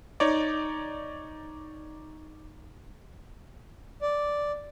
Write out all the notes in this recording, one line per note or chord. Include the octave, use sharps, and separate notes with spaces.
D#4 C#5 D5
D5